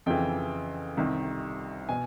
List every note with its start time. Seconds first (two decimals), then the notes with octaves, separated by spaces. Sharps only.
0.06 F2 C#3 E3 G5
0.97 C2 C3 D#3
1.89 B2 G#5